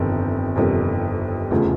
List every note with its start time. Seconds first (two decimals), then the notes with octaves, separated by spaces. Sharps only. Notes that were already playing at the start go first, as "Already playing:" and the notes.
Already playing: G1 F2 C3 D#3 G3
0.56 G1 F2 C3 D#3 G3
1.51 F1 E2 C#3 F3 A3